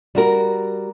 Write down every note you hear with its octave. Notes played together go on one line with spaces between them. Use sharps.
G3 F#4 A#4